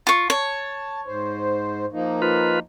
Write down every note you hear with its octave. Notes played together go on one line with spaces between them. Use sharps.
F4 C#6
C#5 A5
G#2 C5
F3 A#3 D#4
F4 B4